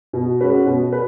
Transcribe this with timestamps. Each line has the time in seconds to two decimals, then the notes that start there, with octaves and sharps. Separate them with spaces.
0.13 B2
0.41 G#3 C#4 F#4 B4
0.67 B2
0.92 B4